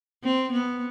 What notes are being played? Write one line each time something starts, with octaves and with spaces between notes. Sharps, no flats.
C4
B3